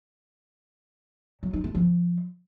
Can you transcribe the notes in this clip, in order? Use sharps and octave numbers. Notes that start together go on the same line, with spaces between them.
F#3
D#4
A3
F3